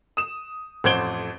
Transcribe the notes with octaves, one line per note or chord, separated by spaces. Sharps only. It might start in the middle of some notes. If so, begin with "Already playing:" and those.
D#6 E7
A1 F2 C5 G#6 D7 G7